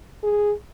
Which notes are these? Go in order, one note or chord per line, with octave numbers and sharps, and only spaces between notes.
G#4